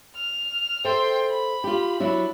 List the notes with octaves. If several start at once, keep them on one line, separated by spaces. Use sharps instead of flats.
F6
A4 C5 E5 G5 C6
B5
F4 G4
F#3 D4 E4